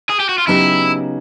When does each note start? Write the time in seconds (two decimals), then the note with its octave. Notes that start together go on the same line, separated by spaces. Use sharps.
0.10 G#4
0.20 G4
0.29 F#4
0.38 F4
0.47 C#3 F#3 B3 D#4 E4 G4